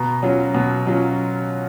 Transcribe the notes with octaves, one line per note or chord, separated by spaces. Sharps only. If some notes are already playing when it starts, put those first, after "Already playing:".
Already playing: B2 A#5
F#3 C#4 F4
B2
F#3 C#4 F4